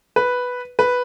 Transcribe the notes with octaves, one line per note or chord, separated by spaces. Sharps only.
B4
B4